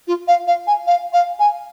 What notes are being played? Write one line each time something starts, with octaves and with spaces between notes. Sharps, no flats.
F4
F5
F5
G#5
F5
F5
G#5